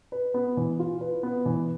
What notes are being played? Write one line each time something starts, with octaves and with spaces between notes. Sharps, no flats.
B4
B3
E3
F4
B4
B3
E3